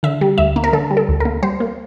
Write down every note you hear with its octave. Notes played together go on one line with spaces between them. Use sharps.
D3 E5
G3
D2 E5
A#3
A#4
D3 A4
G3
A4
D2
A#3 A#4
G3 C5
A#3